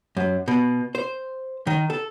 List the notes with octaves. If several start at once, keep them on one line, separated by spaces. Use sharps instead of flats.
F#2
B2
C5
D#3
A4